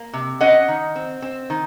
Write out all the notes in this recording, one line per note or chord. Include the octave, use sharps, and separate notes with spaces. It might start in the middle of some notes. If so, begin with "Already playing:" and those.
Already playing: A#3
C3
C#4 D#5 F#5
D#3
C4
C4
D#3